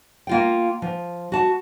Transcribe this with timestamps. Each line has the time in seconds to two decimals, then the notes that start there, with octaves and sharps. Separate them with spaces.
0.27 A#3 F4 G5
0.82 F3
1.32 F#4 A5